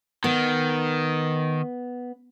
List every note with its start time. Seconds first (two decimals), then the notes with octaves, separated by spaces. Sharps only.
0.24 D#3 B3